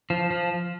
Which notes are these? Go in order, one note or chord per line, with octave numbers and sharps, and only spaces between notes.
F3
F3